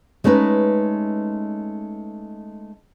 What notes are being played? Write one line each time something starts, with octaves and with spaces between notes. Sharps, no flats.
G#3 A3 C#4 D#4 B4